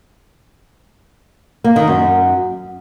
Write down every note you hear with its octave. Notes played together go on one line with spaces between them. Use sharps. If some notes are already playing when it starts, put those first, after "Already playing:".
A#3
D#3
F#2